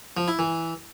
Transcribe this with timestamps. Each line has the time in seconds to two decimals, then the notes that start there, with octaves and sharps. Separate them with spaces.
0.17 F3
0.28 E4
0.39 E3